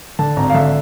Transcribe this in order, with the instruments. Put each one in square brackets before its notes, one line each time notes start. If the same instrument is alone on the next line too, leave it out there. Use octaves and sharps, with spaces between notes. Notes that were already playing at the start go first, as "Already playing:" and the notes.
[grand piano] D3 A5
G#1 A#5
F5
D3 E5